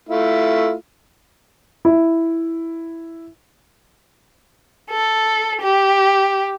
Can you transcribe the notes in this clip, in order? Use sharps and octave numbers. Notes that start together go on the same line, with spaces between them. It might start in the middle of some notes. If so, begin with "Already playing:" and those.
A3 E4 F4
E4
A4
G4